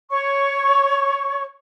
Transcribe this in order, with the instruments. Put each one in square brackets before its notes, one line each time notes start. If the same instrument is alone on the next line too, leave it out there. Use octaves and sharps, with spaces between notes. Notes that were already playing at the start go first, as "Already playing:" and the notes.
[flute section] C#5 C#6